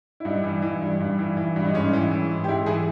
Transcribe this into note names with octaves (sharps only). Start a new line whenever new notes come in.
E4
G2 D#4
E3
E3
G2
G2
E3
E3
G2
D#4
G#2 C#4
E3
E3
G#2
G4
G#2 E4
E3 G#4